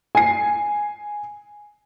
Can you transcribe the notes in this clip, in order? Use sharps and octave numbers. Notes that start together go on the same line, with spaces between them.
G#5 C7